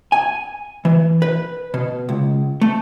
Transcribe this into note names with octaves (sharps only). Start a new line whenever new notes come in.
G#5
E3
B4
B2
C#2
A3